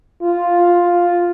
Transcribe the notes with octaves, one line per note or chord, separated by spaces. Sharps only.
F4